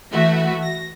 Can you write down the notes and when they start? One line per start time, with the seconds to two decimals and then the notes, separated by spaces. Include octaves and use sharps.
0.12 E3 A3 F#4 E5
0.63 A#6